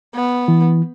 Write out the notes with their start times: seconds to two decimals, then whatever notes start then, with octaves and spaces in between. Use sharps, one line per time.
0.15 B3
0.48 E3